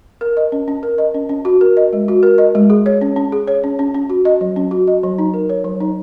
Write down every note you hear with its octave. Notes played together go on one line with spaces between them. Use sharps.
A#4
D#5
C#4
C#4
A#4
D#5
C#4
C#4
F#4
A#4
D#5
G#3
F#4
A#4
D#5
G#3
G#4
C#5
C#4
C#4
G#4
C#5
C#4
C#4
C#4
F#4
D#5
F#3
C#4
F#4
D#5
F#3
D#4
A#4
C#5
F#3
D#4